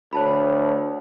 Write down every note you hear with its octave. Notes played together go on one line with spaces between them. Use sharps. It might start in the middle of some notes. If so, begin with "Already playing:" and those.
D2 C#5 A5 B5